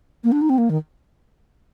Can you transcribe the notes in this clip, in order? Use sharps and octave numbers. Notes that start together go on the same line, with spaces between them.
A#3
D4
D#4
C4
A#3
D#3